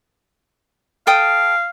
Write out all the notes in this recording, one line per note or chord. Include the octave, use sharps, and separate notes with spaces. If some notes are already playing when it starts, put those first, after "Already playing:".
A4 F5 G5 D#6